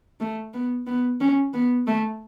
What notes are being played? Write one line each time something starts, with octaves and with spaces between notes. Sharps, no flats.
A3
B3
B3
C#4
B3
A3